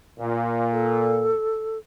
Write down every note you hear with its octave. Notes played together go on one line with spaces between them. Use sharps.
A#2
A4